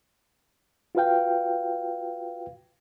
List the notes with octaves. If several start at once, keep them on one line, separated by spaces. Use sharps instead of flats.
F4 F#4 B4 F5 G5